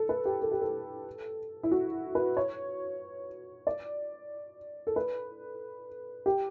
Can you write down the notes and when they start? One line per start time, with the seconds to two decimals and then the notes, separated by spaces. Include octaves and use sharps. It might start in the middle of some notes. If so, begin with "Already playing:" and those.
Already playing: A4
0.09 B4
0.25 G4
0.42 A4
0.51 G4
0.61 A4
1.63 E4
1.71 F#4
2.15 B4
2.37 C#5
3.67 D5
4.87 A4
4.96 B4
6.26 G4